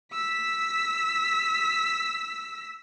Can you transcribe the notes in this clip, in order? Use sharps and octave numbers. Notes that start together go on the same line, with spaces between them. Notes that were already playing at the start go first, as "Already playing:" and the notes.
E6 B6